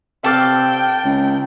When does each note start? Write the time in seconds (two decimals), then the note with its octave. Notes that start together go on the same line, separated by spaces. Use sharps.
0.24 C3 A4 D5 F5 G5
1.04 C#2